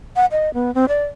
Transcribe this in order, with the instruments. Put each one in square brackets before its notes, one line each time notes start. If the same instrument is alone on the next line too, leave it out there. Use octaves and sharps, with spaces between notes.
[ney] F#5
D#5
B3
C4
D5